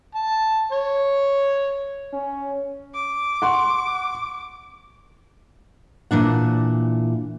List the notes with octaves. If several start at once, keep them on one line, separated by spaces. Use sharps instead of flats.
A5
C#5
C#4
D6
F#5 C6 C#6
A#2 E3 D4 F#5